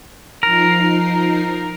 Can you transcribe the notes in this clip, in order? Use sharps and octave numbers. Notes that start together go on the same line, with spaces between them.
F3 D#4 A#4 C7